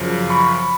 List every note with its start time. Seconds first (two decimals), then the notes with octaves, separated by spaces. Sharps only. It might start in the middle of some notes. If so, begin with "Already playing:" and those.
Already playing: F#2 C#3 F3
0.30 B5 C#6